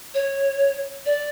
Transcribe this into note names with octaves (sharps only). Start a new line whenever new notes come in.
C#5
D5